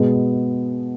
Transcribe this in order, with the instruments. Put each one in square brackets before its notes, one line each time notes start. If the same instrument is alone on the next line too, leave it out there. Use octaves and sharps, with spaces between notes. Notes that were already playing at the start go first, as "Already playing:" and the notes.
Already playing: [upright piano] B2 G#3 B3